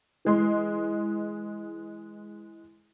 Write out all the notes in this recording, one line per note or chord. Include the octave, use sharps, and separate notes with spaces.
E3 G#3 C6